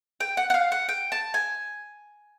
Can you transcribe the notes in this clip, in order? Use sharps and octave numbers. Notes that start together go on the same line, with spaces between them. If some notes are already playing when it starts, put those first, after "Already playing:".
G5
F#5
F#5
F5
F#5
G5
A5
G#5